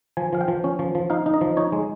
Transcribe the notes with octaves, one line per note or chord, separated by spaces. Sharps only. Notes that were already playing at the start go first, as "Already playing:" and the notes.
F3 G#5
F3 F5
G5
F3
C#4
F3
F3
D#4 F5
D#4
D#5
F3
D#4 C#5
G#3